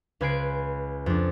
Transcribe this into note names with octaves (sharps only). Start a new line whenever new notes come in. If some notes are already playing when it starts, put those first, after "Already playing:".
C#2 B4 G#5 F#6 C7 D7
F2 D4